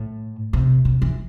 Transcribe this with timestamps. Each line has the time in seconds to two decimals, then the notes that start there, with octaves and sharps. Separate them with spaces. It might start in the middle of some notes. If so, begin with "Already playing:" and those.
Already playing: A2
0.53 C3
0.85 C3
1.02 E3